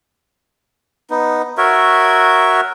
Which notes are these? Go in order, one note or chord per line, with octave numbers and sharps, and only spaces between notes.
B3 D#4
F#4 A#4 C#5 E5